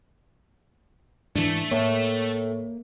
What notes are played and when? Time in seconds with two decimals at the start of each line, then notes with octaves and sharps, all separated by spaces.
1.36 G#2 E3 A3 D4 A4
1.72 A2 A#3 C#5